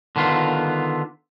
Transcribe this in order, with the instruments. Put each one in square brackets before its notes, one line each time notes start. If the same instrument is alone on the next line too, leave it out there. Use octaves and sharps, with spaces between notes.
[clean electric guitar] D3 D#3 B3 F4